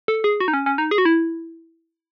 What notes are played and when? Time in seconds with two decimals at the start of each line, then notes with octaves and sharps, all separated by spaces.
0.08 A4
0.24 G#4
0.40 F#4
0.48 D#4
0.54 C#4
0.66 C#4
0.78 D#4
0.91 G#4
0.98 F#4
1.05 E4